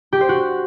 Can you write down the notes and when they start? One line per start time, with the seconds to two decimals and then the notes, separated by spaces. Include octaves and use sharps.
0.12 G4
0.21 C5
0.29 F#4